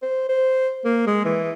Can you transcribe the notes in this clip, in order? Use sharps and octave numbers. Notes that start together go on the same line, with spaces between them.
C5
C5
A#3
G#3
E3